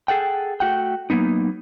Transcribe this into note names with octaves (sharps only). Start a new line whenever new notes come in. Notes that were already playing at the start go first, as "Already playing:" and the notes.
G#4 A4 F#5 G5
A3 F#4 F#5 G5
F#3 A#3 B3 D#4